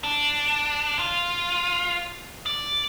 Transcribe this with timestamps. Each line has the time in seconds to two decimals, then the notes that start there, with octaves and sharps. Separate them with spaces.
0.03 D4
0.99 F4
2.46 D5